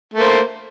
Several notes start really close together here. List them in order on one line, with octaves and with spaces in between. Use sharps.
A3 A#3 C5